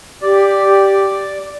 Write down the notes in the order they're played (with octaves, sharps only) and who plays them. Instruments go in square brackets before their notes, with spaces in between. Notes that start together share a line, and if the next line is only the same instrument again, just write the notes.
[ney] G4 [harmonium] D5